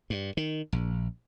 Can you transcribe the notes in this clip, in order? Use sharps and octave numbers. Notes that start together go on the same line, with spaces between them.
G2
D#3
A#1